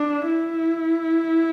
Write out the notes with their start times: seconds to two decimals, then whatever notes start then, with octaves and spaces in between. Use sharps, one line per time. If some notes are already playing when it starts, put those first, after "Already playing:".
Already playing: D4
0.27 E4